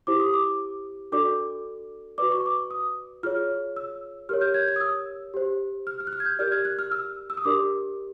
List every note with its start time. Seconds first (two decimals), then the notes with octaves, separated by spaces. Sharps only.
0.07 E4 G4 C5 D6
0.20 D#6
0.33 D6
1.12 D4 F#4 A4 D5 D6
2.18 F#4 B4 D5 D6
2.32 C#6
2.46 D6
2.71 D#6
3.23 F4 G#4 C#5 F6
3.76 E6
4.29 G4 A#4 C#5 F6
4.41 G6
4.54 G#6
4.68 G#6
4.76 D#6
4.81 E6
5.34 G4 C5
5.87 F6
6.00 F6
6.07 F#6
6.13 F6
6.20 G#6
6.26 G6
6.39 G4 A#4 D5 F6
6.52 G#6
6.65 F#6
6.79 F6
6.92 E6
7.30 E6
7.37 D#6
7.45 D4 G4 A#4 D5 D6